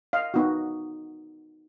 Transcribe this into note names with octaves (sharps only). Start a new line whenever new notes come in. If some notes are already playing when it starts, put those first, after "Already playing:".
D#5 F5
B3 D#4 F#4